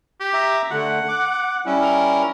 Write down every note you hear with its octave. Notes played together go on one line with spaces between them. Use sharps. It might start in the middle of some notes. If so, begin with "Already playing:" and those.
G4
E5 A#5
D3 A3 F#5
D6
G3 C#4 E4
A#4